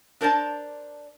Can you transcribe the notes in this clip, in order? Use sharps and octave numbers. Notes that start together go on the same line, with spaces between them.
D4 A#4 C5 D5 A5